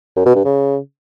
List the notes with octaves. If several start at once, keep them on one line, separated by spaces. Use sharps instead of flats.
F#2
B2
G2
C#3